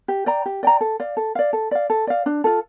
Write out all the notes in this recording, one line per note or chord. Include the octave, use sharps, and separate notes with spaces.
G4
D5 G5 A#5
G4
D5 G5 A#5
A4
D5 F5
A4
D5 F5
A4
D5 F5
A4
D5 F5
D4
F4 A4